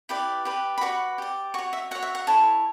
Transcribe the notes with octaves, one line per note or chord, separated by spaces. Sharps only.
E4 G4 B4 D5
G4 B4 D5
B5
F#4 B4 D5 C#6
G4 D5
F#4 C#5 C#6
E5
F#4 C#5 F#5
E5
F#5
E4 A4 C#5 A5